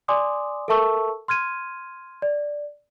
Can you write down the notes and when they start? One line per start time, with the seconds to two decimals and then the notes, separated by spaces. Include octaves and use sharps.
0.08 D5 G#5 C6 D6 D#6
0.68 A4 A#4 E5 A5 C#6 E6
1.28 C6 F6 G#6 D#7
2.22 D5